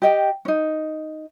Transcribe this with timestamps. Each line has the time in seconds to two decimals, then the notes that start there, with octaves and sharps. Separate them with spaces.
0.02 G4 D#5 G5
0.45 C#4 D#4